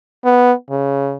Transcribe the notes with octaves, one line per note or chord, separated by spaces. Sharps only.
B3
C#3